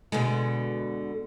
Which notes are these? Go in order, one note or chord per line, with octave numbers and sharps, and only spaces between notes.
B2 D3 G#3